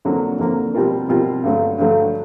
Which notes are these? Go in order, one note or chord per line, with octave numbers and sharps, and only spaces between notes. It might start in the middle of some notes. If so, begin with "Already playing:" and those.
F2 D3 F#3 A#3
F2 D3 F#3 A#3
B2 G3 C4 F4 A#4
B2 G3 C4 F4 A#4
G2 D3 F#3 A3
G2 D3 F#3 A3